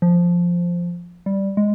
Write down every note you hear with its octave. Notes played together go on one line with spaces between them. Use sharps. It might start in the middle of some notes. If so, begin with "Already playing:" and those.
F3
G3
G#3